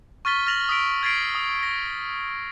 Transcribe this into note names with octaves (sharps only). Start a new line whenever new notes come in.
C#6 F6 A6 B6 G7
F6 A6 A#6 F7 F#7
D#6 E6 B6 D7
F6 G#6 A6 B6 C7 D7
D#6
A#6